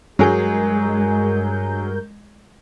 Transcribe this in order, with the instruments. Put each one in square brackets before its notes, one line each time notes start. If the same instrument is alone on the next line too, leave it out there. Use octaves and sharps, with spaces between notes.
[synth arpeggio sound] G2 A#4 G6 [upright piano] F#3 G#4 [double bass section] G#3